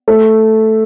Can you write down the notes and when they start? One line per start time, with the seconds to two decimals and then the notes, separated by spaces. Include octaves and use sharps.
0.08 A3